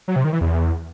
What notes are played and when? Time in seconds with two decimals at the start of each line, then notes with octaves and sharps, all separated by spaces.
0.08 F#3
0.16 C3
0.24 D#3
0.33 E3
0.41 E2